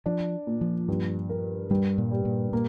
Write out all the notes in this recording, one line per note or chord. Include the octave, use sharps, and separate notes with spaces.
F3 D4
A#2
F3
G2
A#4
G2 G3
A#2
G3
A#2
A#2 A#3